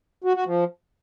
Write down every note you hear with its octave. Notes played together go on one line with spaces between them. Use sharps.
F#4
F#4
F3